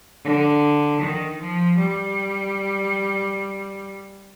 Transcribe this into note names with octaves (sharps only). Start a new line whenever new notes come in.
D3
D#3
F3
G3